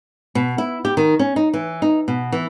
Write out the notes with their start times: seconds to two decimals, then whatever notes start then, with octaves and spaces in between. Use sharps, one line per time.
0.35 B2
0.58 E4
0.85 G4
0.97 D#3
1.19 C#4
1.36 D#4
1.54 E3
1.82 D#4
2.08 B2
2.32 E3